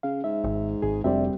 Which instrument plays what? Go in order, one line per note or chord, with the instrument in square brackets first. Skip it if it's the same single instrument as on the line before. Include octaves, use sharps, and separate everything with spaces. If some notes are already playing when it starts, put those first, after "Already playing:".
[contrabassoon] C#3 [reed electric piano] F5
[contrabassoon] G#2 [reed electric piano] E5
[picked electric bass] G#1
[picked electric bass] G#1 [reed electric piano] G#4
[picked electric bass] F1 [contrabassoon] D2 [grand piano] G3 C4 [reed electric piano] D5 E5